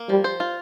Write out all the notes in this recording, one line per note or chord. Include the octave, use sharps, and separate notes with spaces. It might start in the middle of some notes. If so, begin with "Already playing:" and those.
Already playing: A#3
F3 G3
C5
F4